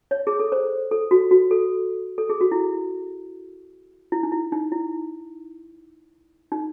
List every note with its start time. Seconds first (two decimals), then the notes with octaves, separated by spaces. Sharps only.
0.11 C#5
0.27 G#4
0.40 A4
0.52 C5
0.91 A4
1.11 F#4
1.31 F#4
1.51 A4
2.18 A4
2.29 G#4
2.41 F#4
2.52 E4
4.12 E4
4.23 D#4
4.32 E4
4.52 D#4
4.72 E4
6.52 D#4